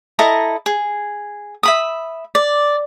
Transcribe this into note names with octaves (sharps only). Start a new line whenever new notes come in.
E4 A4 D#5 A#5
G#4
E5 B5 D#6
D5